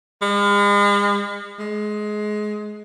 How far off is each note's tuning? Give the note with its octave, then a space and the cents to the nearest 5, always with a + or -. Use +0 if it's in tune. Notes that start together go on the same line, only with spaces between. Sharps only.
G#3 -40
G#3 +20